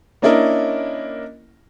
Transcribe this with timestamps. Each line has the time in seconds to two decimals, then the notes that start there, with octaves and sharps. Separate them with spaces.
0.22 A#3 C#4 D4 E4 A#4 D#5